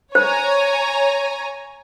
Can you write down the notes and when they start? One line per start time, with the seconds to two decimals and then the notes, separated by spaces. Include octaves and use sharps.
0.15 C5 C#5 G#5 A#5